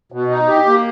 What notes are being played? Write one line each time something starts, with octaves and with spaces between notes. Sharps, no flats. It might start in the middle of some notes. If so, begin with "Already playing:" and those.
B2
D#4
G4
A#3